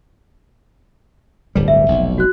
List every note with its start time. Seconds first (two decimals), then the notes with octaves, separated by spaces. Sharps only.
1.55 D1 G1 G3
1.68 E5
1.88 F1 B1
2.18 F#4 F#6